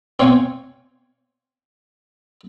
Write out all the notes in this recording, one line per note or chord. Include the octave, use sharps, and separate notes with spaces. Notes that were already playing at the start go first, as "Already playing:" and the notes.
C4 C#5 F5 G5 G#5 C#6